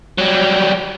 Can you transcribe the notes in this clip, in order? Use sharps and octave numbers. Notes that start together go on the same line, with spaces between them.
F#3 G3